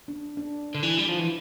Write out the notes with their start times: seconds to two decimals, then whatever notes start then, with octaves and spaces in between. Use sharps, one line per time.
0.08 D4
0.37 D4
0.75 D3
0.83 E3
0.99 G3
1.09 F3
1.19 E3